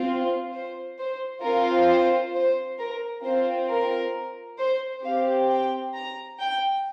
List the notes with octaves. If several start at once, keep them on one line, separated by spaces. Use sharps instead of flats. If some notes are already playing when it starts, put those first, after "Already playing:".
Already playing: C4 F4
C5
C5
C4 F4 A#4
C5
C5
A#4
C4 F4 C5
A#4
C5
C4 G4 F5
G5
A#5
G5